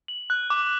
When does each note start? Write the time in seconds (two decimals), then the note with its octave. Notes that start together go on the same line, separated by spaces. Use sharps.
0.08 F#7
0.30 F#6
0.50 D6